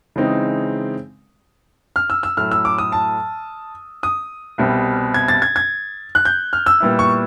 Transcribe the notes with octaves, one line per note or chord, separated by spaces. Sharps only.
C#3 E3 G#3 C4 D#4
F6
E6
E6
A2 F#3 A3 F6
E6
D6
D#6
A5
D#6
C2 B2 G3 C4
G#6
A6
G#6
G#6
F#6
G6
F6
E6
A#2 G3 B3 E4
C#6